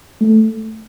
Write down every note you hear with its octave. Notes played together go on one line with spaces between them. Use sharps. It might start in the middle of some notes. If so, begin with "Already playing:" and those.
A3